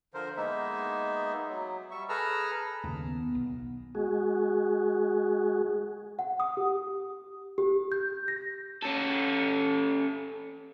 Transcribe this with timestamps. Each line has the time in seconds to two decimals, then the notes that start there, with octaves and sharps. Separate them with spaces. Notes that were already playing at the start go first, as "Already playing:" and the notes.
0.14 D3 F3 A#4 C5
0.37 G#3 A#3 B3 D#4 E5
1.48 F#3
1.91 G3 E5 C#6
2.09 G#4 A4 B4 A#5 E6 F6
2.84 D#2 C#3
3.01 B3
3.35 B1
3.95 G#3 F#4 G#4
6.19 F#5
6.40 D#6
6.57 G4
7.58 G4
7.92 G6
8.28 A#6
8.83 C#4 A4